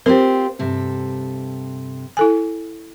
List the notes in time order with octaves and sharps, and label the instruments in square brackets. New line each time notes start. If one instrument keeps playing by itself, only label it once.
[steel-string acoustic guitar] C4 F4 G4 [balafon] A#4 C5
[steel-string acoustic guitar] G2 C3 A4
[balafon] E4 A4 G#5